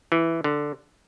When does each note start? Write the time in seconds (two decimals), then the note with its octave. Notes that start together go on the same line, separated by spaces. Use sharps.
0.12 E3
0.44 D3